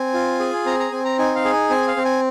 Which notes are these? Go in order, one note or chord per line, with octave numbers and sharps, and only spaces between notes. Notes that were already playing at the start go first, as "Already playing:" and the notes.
Already playing: C4 G#5
F4
G#4
C4 A#5
A#5
C4 G#5
A#5
D#4 G#5
F5
G#4
G#5
C4 G#5
F5
C4
G#5